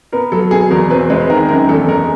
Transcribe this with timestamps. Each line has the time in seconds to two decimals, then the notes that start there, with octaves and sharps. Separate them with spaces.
0.12 B3 A#4
0.32 F#3 A4
0.51 B2 G#4
0.70 E2 A#4
0.90 C4 B4
1.10 G#3 B4
1.30 D#3 A#4
1.49 F#2 A#4
1.69 E2 A4
1.88 G#3 A#4